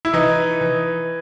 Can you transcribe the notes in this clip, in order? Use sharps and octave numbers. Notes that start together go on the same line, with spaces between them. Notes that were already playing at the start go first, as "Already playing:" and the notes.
E4
E3 D#4
E3